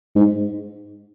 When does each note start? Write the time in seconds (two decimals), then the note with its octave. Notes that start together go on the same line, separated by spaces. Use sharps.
0.15 G#2